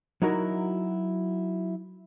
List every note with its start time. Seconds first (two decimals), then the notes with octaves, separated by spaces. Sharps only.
0.22 F#3 D#4 E4 F#4 A#4